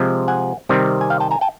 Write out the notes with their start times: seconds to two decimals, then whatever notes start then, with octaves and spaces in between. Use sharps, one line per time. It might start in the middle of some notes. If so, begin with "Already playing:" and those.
Already playing: C3 F3 G#3
0.28 F#5 G#5
0.69 C3 D#3 G3 C4
1.01 G#5
1.10 F5 G5
1.20 G5 A5
1.31 G#5 A#5
1.41 G5 A5